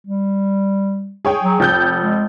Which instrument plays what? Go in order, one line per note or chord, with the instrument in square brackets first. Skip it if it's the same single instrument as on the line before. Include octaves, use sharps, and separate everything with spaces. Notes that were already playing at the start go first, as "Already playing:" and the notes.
[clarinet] G3
[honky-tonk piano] G#4 C#5 G5
[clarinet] F#3
[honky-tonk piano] F1 G6 [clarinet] G5
[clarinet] G#3